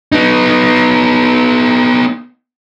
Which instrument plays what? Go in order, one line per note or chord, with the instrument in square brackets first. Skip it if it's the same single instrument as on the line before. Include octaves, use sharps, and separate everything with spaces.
[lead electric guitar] B3 D#4